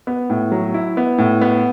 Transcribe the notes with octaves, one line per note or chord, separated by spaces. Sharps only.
B3
A2
F#3
E4
B3
A2
B3